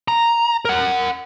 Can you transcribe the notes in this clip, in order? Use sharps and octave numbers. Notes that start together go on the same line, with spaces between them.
A#5
A#4 F#5